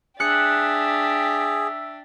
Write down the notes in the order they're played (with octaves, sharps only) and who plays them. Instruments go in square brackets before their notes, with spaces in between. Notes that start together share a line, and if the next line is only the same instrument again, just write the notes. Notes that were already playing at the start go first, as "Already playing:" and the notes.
[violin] D4 G4 [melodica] G#4 [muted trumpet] E5 [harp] F#6 C#7